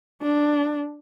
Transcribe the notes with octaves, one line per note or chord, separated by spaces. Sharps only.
D4